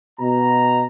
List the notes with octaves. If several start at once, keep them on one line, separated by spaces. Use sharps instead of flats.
B2 A#5